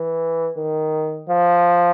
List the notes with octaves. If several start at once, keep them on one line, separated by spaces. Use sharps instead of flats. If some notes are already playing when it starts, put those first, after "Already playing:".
Already playing: E3
D#3
F3